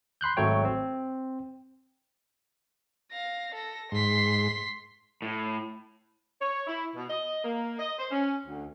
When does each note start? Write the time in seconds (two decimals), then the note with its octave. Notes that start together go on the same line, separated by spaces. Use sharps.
0.21 B5 C6 F#6 G6
0.37 G#1 F#3 A3 C#5 G5
0.65 C4
3.11 F5 A#6
3.55 A4 A#6
3.92 G#2 C6 B6
5.22 A2
6.41 C#5
6.67 E4
6.95 B2
7.09 D#5
7.44 A#3
7.79 D#5
7.98 C5
8.11 C#4
8.46 D2